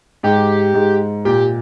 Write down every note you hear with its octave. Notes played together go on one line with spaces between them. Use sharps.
G#2 G4
G#2
A#2 G4